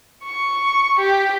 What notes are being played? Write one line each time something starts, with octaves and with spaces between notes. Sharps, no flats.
C#6
G4